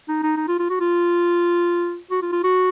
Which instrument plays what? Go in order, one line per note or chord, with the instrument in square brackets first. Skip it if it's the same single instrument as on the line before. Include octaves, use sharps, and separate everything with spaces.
[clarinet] D#4
D#4
D#4
F4
F4
F#4
F4
F#4
F4
F4
F#4